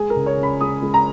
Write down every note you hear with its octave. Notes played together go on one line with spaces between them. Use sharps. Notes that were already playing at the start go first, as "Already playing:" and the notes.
Already playing: G#3 G#4
A#4
C#2
C#5
C#3
B5
G#3 D#6
G#3
A#5